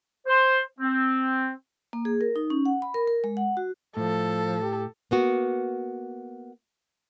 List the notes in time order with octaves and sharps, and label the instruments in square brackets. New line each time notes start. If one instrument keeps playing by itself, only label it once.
[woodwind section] C5
C4
[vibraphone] A#3
G#4
A#4
D#4
C#4
F#5
B5
A#4
A#4
G#3
F#5
F#4
[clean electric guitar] A2 [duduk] F3 [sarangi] A4
[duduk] G4
[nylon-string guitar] A#3 B3 F#4